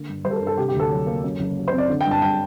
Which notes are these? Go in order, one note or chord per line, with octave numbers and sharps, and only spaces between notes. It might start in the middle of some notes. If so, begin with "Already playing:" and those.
Already playing: D3 A#3
G2
G3 C5
A4
A#4
G2
A4
C3 G4
G4
D2 A4
F#3
A#3
F#2
F#1
F#3
C5
C4
D5
D3
G5
G2
A5
G3 G5